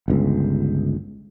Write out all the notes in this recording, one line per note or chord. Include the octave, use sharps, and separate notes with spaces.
G1 C#2